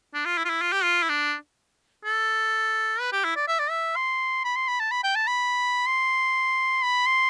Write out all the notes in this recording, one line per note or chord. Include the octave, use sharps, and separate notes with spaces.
D4
F4
E4
F4
E4
F4
G4
F4
E4
D4
A4
B4
G4
E4
D5
E5
D5
E5
C6
B5
C6
B5
A5
B5
G5
A5
B5
C6
B5
C6